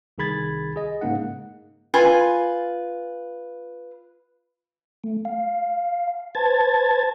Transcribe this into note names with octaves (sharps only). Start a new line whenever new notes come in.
C2 D#3 G#4 B5 G#6 A6
G#4 D#5
G#2 C#3 A#3 D#4 F#5
F4 B4 G#5
A3
F5
B4 C5 A5 G#6 A6